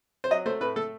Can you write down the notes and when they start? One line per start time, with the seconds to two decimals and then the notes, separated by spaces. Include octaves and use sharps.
0.24 C5
0.31 F#3 D#5
0.46 A3 C5
0.61 A2 B4
0.76 A3 A4